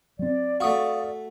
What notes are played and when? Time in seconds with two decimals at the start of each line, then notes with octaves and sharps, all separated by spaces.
0.19 F#3 C4 D5
0.60 A3 F#4 F5 D#6